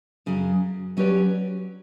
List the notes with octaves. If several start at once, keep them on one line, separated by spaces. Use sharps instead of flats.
F#2 C#3 F#3
F#3 C#4 G4 B4 D5